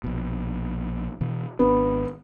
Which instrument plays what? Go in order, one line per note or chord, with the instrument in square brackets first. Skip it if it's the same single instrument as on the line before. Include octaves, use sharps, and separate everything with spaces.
[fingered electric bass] A#1 B2
B2 E3
[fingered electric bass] G#1 D4 [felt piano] B3